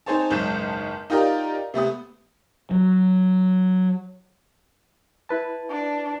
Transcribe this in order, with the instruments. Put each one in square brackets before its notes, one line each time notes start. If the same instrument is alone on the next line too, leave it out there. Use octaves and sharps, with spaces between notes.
[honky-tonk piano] C4 D#4 G#4 C5 C#5 A5
F#1 B1 G#2 C#4 G6 E7
D#4 F4 G4 A#4 D5 D#5
C3 A3 B3 D#6
[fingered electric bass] F#3
[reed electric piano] E4 B4 A5
[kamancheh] D4